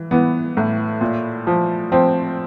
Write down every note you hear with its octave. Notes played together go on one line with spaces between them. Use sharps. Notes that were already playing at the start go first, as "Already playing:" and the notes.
Already playing: E3
E3 B3
A2
A#2
F3
F3 C4